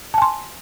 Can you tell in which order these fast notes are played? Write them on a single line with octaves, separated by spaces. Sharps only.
A5 G#5 C6